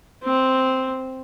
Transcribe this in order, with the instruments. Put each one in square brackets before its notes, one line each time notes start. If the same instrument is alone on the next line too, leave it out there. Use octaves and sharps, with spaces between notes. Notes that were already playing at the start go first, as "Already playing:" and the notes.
[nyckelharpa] C4